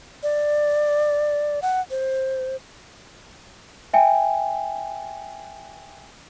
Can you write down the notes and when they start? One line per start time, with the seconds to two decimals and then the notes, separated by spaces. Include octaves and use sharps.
0.23 D5
1.62 F#5
1.90 C5
3.93 E5 G5 G#5